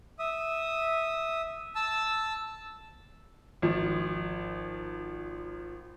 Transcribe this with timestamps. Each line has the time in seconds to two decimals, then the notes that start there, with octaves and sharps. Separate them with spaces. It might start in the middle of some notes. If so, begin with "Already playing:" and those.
0.19 E5 D#6
1.75 A5 E6
3.62 G#1 F3